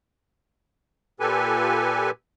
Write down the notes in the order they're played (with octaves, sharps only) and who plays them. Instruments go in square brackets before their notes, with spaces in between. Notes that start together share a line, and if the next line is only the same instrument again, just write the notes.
[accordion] A#2 G4 A4 B4 G#5